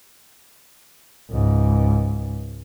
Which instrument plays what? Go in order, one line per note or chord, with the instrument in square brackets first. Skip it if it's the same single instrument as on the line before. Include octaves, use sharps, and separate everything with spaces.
[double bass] C#2 G#2